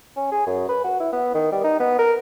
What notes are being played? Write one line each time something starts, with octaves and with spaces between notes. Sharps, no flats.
C#4
G#4
F#2
B4
F#4
E4
B3
D#3
G3
D#4
B3
A#4